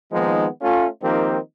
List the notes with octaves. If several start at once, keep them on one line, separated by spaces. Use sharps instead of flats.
D#3 F3 G#3 A#3 B3 D#4
A3 C#4 F4
D#3 F3 A#3 C4 D#4 G4